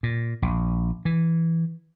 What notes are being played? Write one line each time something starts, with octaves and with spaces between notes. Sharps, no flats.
A#2
A#1
E3